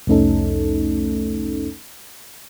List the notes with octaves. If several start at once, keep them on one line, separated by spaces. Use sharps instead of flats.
C2 F2 A3 C#4 D#4 A4